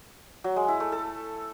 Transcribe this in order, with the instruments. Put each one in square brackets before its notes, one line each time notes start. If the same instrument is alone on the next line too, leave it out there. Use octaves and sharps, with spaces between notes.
[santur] F#3
G#3
E4
A3
A4